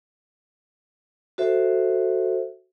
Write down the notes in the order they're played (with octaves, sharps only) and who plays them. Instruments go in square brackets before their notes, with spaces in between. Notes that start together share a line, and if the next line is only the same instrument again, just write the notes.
[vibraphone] F#4 A4 C5 E5